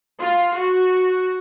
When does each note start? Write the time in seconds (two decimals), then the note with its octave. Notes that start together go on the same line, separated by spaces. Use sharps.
0.19 F4
0.54 F#4